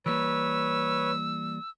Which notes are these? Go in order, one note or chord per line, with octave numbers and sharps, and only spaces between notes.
E3 G3 A#3 B4 C#5 E6